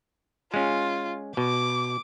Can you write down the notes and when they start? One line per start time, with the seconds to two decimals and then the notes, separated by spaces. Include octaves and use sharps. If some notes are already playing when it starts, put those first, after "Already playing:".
0.54 G#3 C#4 F4
1.37 B2 D6